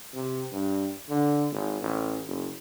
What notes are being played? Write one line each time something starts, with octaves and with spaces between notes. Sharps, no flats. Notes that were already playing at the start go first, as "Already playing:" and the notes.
C3
G2
D3
G#1
A1
F#1